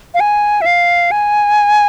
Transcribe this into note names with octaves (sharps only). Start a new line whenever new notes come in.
F5
G#5
E5
F5
G#5